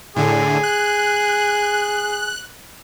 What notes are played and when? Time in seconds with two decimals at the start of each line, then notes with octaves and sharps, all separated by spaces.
0.16 A2 D3 G#4
0.63 F#6